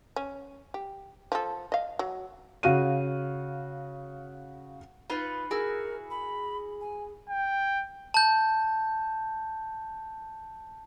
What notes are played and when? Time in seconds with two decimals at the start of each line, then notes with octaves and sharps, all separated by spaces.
0.16 C#4
0.74 G4
1.32 F3 A4
1.72 D#5 F5
1.99 F#3
2.63 C#3 F#4 F5 D#7
5.10 D#4 F4 B4 B5
5.51 E4 F#4 G#4 A#4
6.10 B5
6.81 G#5
7.29 G5
8.14 A5 G6